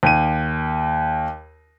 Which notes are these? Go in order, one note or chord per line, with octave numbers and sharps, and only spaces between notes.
D#2 D#7